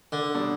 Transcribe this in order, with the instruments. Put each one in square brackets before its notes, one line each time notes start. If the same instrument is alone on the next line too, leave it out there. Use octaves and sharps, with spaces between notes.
[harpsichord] D3
[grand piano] B2 G3 D4